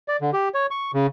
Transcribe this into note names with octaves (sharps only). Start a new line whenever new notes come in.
D5
D3
G4
C#5
C#6
C#3